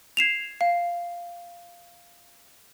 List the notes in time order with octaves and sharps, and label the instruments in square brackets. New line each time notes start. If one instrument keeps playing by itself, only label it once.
[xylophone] G#6 C7 E7 F7
F5